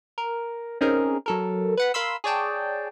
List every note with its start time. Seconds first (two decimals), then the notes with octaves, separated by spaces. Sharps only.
0.18 A#4
0.81 C4 C#4 D#4 G#4 A#4
1.26 F#3 A4 A#4
1.77 B4 F#5 B5
1.94 A#4 F5 B5 C6 E6
2.24 G#4 C#5 D5 G5 A5